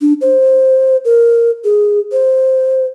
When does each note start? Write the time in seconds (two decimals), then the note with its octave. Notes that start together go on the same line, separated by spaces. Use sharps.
0.01 D4
0.21 C5
1.05 A#4
1.64 G#4
2.12 C5